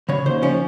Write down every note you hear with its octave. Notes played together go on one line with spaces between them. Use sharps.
C#3 C#5
D#2 C5
F3 C#4